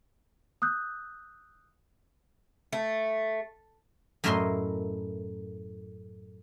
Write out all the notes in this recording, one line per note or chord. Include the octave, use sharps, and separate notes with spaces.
D#6 E6 F#6 G6
A3
F#2 A2 E4 A#4 D#5 C6